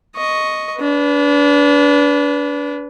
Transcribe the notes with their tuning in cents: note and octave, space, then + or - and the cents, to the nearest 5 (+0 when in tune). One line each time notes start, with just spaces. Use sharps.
D#5 +0 C#6 +0
D4 -30 B4 +0